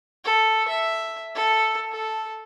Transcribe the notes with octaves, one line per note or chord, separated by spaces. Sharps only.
A4
E5
A4
A4